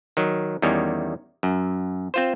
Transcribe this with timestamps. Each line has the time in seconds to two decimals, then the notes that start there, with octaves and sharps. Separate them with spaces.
0.17 D#3 F#3
0.62 E2 D#3 G3 C#4
1.43 F#2
2.14 C4 F4 C5